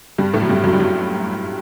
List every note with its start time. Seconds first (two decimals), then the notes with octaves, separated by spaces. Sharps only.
0.18 G2 G3
0.33 A2 A3
0.42 F#3
0.49 G2 G3
0.64 F#2 F#3
0.73 G3
0.80 F#3